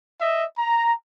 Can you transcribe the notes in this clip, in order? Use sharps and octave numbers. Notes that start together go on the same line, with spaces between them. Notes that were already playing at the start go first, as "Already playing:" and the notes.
D#5 E5
A#5